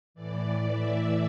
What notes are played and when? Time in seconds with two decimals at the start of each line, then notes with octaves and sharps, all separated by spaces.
0.14 A2 E3 D5
0.66 E5